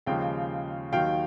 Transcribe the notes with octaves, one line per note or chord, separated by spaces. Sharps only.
D#2 C#3 F3 G#3 F5 G5
D#2 D#3 F#3 F5 G5